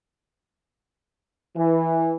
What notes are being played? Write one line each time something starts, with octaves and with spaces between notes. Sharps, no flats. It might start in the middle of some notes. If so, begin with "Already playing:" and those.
E3